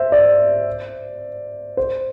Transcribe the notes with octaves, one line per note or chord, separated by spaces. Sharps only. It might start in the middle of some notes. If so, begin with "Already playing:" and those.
Already playing: C5 E5
D5
C5